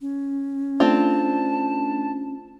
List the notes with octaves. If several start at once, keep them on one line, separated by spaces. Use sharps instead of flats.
C#4
A3 C4 D4 F4 A5